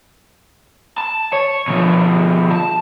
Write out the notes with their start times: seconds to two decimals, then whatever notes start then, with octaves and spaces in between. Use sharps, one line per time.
0.98 A5
1.33 C#5
1.68 B2 F3
2.51 A5